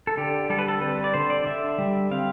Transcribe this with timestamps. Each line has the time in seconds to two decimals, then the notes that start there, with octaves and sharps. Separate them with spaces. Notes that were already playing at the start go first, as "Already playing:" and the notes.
0.07 A4
0.17 D3 G4
0.50 G3 A4
0.59 B4
0.68 A4
0.81 C4 B4
1.04 D5
1.14 D3 C5
1.30 D5
1.46 D3 E5
1.78 G3
2.11 C4 F5